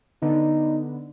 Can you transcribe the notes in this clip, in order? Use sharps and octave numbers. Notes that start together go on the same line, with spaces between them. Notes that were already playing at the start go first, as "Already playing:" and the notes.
D3 B3 D#4